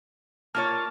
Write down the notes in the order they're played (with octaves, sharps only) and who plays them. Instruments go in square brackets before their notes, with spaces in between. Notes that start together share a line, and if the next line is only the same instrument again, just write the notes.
[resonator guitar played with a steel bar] A#3 F4 C#5 [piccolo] A5 [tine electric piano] F6